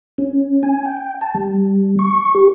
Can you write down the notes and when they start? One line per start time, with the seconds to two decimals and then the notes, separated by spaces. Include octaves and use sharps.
0.18 C#4
0.63 G#5
0.85 G5
1.21 A5
1.35 G3
1.99 C#6
2.35 G4